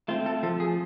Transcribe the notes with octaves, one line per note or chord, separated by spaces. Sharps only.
A3 C4 F4
A4
F3 A4
G#4